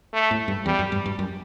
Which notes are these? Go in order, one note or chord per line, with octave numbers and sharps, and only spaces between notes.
A3
A2
G2
E2 G3
F#2
G2
G2
F#2